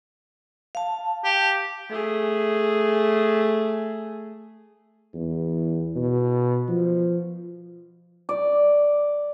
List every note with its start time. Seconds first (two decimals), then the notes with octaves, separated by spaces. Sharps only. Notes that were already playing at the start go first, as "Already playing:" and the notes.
0.75 F5 A5
1.24 G4
1.89 A3 G#4
5.14 E2
5.96 B2
6.68 F3
8.29 D5